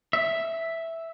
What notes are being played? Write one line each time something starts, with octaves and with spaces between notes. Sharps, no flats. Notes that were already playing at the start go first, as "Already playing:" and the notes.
E5